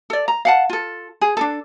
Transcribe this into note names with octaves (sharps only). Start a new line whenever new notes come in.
A4 D5
A#5
F5 F#5 A5
F4 A4
G#4
D4 D#4 A4